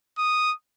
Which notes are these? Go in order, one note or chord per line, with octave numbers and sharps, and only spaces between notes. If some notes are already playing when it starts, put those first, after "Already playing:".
D#6